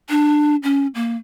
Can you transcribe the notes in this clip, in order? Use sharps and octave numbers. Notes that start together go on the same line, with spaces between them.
D4
C#4
A#3